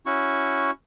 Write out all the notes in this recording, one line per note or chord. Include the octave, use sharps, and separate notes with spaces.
C#4 E4 F#4 C#6